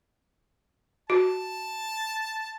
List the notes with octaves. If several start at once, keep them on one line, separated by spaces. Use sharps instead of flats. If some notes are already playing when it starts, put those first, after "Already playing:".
F#4 A5